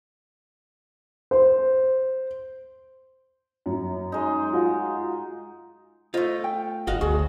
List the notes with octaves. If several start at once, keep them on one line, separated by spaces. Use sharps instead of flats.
C5
F#2
G#3 D#4
F4 F#4
A3 F4 C5 D#5
G5
G1 F#4 D#5 F5
D2 F#4 G#4